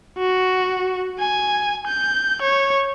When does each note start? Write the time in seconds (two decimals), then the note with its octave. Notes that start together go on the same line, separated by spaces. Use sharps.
0.18 F#4
1.19 G#5
1.87 G6
2.42 C#5